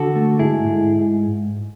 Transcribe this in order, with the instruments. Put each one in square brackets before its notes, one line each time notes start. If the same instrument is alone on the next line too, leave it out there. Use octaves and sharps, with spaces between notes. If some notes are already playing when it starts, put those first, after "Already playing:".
Already playing: [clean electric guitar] D3 F#4 A4
A3
G#2 E4 G#4
G#2